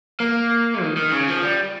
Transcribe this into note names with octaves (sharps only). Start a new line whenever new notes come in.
A#3
D#3
D#3
C#3
F3
G3